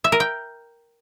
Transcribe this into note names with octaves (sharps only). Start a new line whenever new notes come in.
E5
A#4
G5